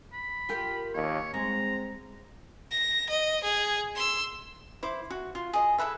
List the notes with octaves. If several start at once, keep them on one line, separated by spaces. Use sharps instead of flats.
B5
F4 G4 A#4
D#2 C#5
G#3 C4 A#5
A#6
D#5
G#4
C6 E6
E4 C5 D6
F#4
F4
G#4 D#5
E4 A4 B4 E5